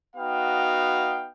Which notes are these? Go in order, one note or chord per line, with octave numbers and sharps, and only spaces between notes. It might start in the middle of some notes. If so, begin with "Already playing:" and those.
B3 D#4 F#4 F5 G5